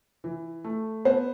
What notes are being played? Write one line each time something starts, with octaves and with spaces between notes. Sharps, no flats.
E3
A3
B3 C5